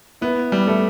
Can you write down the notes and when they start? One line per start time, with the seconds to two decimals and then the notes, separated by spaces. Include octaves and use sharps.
0.21 B3 E4
0.52 G3
0.67 A3